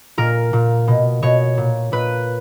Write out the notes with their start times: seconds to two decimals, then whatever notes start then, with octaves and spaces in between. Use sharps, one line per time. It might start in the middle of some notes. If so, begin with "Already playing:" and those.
0.17 A#2 A#4
0.53 A#2
0.87 B2
1.22 B2 C#5
1.57 A#2
1.92 A#2 B4